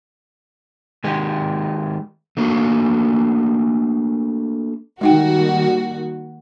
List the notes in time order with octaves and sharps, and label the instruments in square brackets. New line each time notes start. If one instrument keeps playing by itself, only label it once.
[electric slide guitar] D#3 G#3 G4
A3 A#3 D4 F#4 D5 F5
[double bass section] D#3 G3 A#3 [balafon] G#3 D#4 G5 [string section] F#4